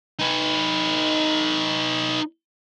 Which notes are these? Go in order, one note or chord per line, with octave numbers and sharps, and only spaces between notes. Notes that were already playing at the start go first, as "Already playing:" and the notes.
D#4 B4